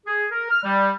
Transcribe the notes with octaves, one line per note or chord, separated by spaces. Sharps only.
G#4
A#4
F6
G3